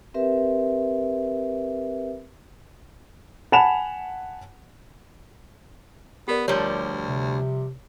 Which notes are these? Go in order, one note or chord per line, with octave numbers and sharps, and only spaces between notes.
C4 G4 A#4 B4 E5
F#5 G#5 A5 B5 E7 F7
B3 G4 A#4 D5
D2 F3 G3 C#5 A#5
C3